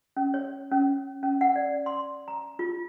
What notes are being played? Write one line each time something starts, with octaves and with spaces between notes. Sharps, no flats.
C#4
C#5
C#4
C#4
F#5
D5
C6
A#5
F4